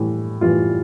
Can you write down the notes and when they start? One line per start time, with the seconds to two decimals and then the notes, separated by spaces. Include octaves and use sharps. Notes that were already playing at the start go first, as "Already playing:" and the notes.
Already playing: A2 E3 G3
0.41 A2 E3 G3 F4